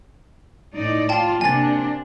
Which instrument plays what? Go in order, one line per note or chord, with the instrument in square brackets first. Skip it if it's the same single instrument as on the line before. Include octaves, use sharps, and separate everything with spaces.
[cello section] A2 D#4 D5
[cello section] F4 D5 [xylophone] G5 A5
[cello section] C3 A#3 D4 [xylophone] G#5 A6